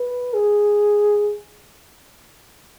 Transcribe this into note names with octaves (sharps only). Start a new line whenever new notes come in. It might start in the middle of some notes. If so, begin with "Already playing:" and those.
Already playing: B4
G#4